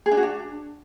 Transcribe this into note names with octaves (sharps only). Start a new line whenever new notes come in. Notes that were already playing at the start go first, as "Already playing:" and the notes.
G#4
D4
F#4
D4